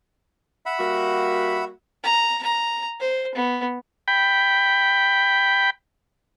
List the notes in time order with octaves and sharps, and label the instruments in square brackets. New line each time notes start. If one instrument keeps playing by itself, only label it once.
[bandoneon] E5 F#5 B5
[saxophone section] G3 A#3 F#4
[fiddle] A#5
A#5
C5
B3
[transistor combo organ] G5 B5